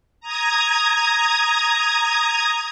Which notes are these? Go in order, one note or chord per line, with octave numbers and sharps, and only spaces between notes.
A#5 D#6 G#6